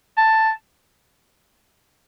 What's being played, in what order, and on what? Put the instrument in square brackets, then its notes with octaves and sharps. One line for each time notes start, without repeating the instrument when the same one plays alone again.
[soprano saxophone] A5